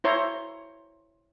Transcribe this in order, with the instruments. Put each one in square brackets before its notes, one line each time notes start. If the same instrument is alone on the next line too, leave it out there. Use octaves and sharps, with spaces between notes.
[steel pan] E4 C5 C#5 A#5